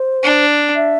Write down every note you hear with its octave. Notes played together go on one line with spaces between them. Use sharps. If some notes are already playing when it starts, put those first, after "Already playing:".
Already playing: C5
D4
E5